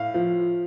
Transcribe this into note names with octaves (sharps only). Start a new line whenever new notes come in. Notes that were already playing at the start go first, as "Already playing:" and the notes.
Already playing: A2 F5
F3